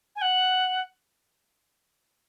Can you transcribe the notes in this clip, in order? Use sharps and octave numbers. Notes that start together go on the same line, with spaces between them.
G#5
F#5